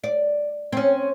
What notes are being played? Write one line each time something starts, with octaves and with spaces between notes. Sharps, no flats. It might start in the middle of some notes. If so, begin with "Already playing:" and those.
D5
C4 C#4